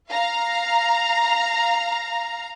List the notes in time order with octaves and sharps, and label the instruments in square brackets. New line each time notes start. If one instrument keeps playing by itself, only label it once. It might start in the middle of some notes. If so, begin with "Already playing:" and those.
[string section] F5 A#5